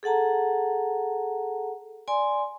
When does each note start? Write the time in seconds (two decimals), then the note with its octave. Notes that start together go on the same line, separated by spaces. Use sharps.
0.03 G#4 A4 F#5 A5 A#5
2.08 D5 G#5 C6